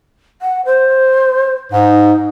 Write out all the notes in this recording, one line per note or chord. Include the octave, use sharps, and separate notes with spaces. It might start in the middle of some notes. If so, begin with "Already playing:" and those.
F#5
C5
G#2 D#4